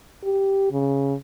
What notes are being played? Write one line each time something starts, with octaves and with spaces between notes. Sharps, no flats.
G4
C#3